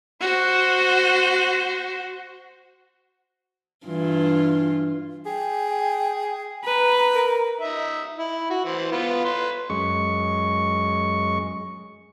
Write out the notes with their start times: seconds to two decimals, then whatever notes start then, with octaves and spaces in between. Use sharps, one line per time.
0.21 F#4 C5
3.86 G2 E3 F4
5.26 G#4 G5
6.65 B4 A#5
7.15 A#4
7.61 D#4 E5
8.18 E4
8.50 F#4
8.65 E3 C5
8.92 B3 F4
9.25 B4 C6
9.70 F#2 G#3 C#6